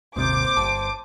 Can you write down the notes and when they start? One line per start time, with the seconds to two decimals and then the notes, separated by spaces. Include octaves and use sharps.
0.16 D#1 G#1 C3 A#3 C4 C5 D6 G6
0.57 G1 A5